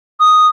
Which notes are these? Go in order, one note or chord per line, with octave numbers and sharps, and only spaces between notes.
D#6